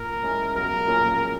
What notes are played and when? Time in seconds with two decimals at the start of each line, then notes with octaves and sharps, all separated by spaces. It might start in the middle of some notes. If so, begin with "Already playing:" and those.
Already playing: A#2 A#4
0.23 G#3 C#4 E4 G#4
0.56 B1 A#4
0.87 A#2 A#3 C#4 G#4